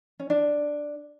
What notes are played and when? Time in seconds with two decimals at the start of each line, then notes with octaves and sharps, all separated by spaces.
0.20 C#4
0.30 D4